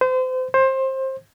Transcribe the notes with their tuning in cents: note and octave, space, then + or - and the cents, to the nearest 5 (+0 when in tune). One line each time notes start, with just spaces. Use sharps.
C5 -35
C5 +20